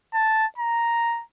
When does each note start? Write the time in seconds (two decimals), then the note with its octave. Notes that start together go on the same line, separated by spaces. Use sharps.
0.14 A5
0.58 A#5